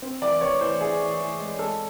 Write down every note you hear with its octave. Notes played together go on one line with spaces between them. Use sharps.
C4
E3 D5
E3 C#5
E3 C5
E3 G#4
E3
E3
G#3
G#3 A4